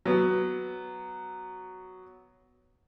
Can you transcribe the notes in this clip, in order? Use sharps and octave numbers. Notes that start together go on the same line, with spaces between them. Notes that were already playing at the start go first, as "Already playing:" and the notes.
F#3 B3